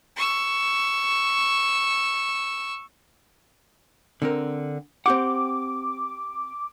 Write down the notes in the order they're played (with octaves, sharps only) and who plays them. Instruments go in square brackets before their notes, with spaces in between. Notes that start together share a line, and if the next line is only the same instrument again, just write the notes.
[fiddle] C#6 E6
[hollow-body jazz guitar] D3 C4 A#4
[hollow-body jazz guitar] C4 G4 F#5 [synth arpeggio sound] D6